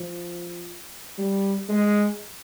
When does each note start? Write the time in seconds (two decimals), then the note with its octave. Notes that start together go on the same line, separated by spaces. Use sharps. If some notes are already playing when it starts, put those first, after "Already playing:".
Already playing: F3
1.18 G3
1.68 G#3